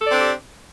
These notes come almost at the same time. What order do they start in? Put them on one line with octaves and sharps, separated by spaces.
A4 D5 C4 D4 G4